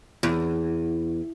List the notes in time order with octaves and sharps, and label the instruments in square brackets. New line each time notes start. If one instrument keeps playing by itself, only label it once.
[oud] E2